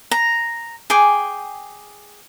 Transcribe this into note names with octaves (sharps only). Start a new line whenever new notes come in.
A#5
G#4 G5 G#5 D6